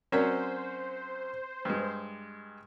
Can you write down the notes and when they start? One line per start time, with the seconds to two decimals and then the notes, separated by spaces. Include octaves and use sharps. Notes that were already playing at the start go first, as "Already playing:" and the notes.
0.12 F#3 C4 C#4 A#4 C5 D5
1.65 G2 G#3